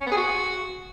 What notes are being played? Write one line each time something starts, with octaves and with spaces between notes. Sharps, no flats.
C#4
B3
G#4
F#4